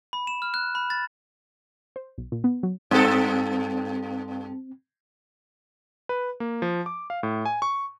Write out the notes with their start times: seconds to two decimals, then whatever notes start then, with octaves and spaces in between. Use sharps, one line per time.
0.13 B5
0.27 E7
0.42 F6
0.54 F#6
0.75 B5
0.90 A6
1.96 C5
2.18 B1
2.32 A#2
2.44 B3
2.63 F#3
2.91 G2 C4 A4
6.09 B4
6.40 A#3
6.62 F3
6.86 D6
7.10 F5
7.23 A2
7.45 G#5
7.62 C#6